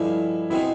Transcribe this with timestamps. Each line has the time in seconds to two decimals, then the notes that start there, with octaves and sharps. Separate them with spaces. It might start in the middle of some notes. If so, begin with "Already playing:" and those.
Already playing: G2 D3 F3 G#3 E4
0.50 B2 G#3 C4 D#4 E4